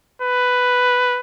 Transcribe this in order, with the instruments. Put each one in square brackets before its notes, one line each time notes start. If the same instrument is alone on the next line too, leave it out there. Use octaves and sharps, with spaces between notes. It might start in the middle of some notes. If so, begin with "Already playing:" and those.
[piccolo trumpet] B4